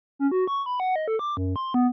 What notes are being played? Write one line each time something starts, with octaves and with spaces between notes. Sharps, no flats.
C#4
F#4
C#6
B5
F#5
D#5
A4
D6
F#2
C6
B3